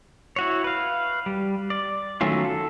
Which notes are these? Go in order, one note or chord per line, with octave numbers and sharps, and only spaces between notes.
E4 F#4 C#5
B4 F5
G3
D5
D#3 F#3 A3 C#4 F4
A4